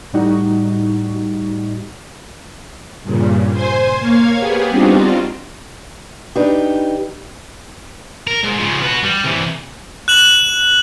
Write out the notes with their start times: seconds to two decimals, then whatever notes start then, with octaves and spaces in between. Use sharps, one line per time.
0.13 A2 G3 D#4 F#4
3.03 G2 A#2 C#3
3.53 C5 G#5 C6
4.00 A#3 C#5 F5 G#6
4.39 B3 G4 G#4
4.69 G3 C4 D4 D#4 F4 F#4
6.36 D4 D#4 G4 B4
8.27 A#4
8.44 G#2
8.59 C#3 F3
8.83 F#4 B4
9.04 G3
9.24 C2 E3
10.08 F#6 E7 F#7